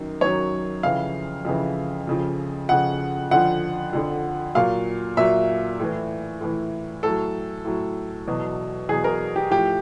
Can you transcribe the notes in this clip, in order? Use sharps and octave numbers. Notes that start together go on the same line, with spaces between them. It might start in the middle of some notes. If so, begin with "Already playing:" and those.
Already playing: F#2 D#3 F#3
F#2 D#3 F#3 C#5
F2 C#3 E3 F5
F2 C#3 E3
F2 C#3 F3
F2 C#3 F3 F#5
F2 D3 F3 F#5
F2 D3 F3
A#2 F#3 F5
A#2 F#3 E5
A2 E3
A2 E3
A2 F#3 A4
A2 F#3
E2 B2 F#3
E2 B2 F#3 G#4
A#4
G4
A2 F3 G4